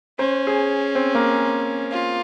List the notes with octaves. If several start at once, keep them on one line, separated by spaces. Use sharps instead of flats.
C#4 C5
G#4
C4
A#3
F4